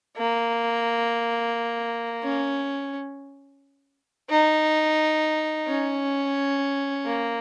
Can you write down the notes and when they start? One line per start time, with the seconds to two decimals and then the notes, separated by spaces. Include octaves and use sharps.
0.17 A#3
2.23 C#4
4.30 D#4
5.67 C#4
7.05 A#3